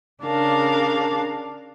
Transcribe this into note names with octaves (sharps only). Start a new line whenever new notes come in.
C#3 D4 A#4 F5